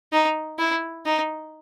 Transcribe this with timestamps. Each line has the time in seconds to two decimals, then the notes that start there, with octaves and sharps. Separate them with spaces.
0.12 D#4
0.59 E4
1.06 D#4